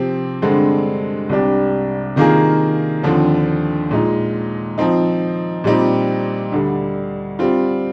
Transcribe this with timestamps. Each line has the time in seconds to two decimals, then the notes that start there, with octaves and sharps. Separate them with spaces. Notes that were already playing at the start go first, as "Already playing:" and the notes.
Already playing: C3 F3 C4 G4
0.42 G2 D3 G#3 C4
1.29 C2 C3 G3 D4 G4
2.16 C3 D#3 A#3 F4 G#4
3.03 D#2 D3 F3 C4
3.91 A#2 G#3 D#4
4.78 F3 C4 D#4
5.64 A#2 G3 C4 D#4 G4
6.52 D2 D3 G3
7.39 G3 C4 F4